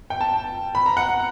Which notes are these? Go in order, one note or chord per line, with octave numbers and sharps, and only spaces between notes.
G5
A5
B5
A#5
F#5